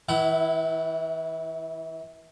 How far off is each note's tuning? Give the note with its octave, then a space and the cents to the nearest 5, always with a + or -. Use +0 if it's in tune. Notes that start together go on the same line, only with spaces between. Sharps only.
E3 -35 E4 +0 F#5 +40